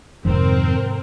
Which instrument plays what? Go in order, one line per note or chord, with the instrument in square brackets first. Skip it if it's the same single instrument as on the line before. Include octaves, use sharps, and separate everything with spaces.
[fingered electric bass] F2 D#3 [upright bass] G#2 C3 [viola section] C4 A#4